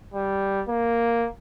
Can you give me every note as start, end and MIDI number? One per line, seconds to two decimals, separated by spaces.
0.14 0.63 55
0.68 1.27 58